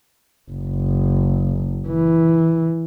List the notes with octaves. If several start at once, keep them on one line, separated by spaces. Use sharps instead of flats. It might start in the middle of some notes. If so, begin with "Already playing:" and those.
F#1
E3